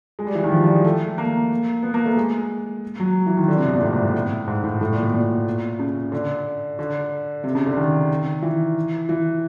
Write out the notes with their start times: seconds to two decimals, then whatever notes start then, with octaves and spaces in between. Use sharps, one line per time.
0.19 G#3
0.27 G3
0.35 E3
0.44 D#3
0.52 F3
0.63 G3
0.74 G#3
0.84 A3
1.18 A#3
1.83 B3
1.94 A#3
2.06 A3
2.17 G#3
3.00 F#3
3.27 E3
3.37 D#3
3.48 D3
3.57 C3
3.66 B2
3.73 A#2
3.81 A2
3.93 G#2
4.04 A2
4.47 G#2
4.64 A2
4.81 A2
4.92 A#2
5.03 B2
5.14 A#2
5.79 C#3
6.12 D3
6.79 D3
7.44 C3
7.55 C#3
7.66 D3
7.77 D#3
8.43 E3
9.09 E3